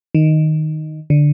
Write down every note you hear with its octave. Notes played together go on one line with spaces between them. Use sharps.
D#3
D3